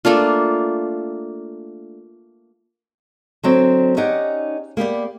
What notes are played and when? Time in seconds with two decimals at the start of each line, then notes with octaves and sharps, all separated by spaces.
0.05 A3 A#3 D4 F4
3.43 D3 F#3 C4
3.97 C#4 D#4 G4 D5 F#5
4.77 A#3 B3 G4 D5